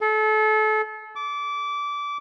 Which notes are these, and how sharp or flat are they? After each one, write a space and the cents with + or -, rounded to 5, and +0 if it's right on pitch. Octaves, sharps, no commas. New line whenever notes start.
A4 -30
D6 -20